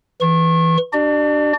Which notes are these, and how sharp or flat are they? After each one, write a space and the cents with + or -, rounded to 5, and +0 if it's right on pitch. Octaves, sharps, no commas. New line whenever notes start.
E3 +5 C#6 -35
D4 +10 G4 -40 D5 +35